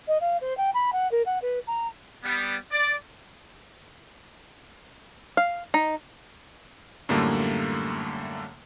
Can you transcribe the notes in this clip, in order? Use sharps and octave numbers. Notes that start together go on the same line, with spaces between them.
D#5
F5
C5
G5
B5
F#5
A#4
F#5
B4
A#5
G3 B3
D5
F5
D#4
F#2 A2 D3 G3 A3 A#3